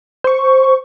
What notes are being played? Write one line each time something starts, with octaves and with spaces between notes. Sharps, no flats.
C5 C#6